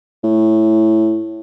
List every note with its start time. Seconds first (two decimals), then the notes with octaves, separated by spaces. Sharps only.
0.24 A2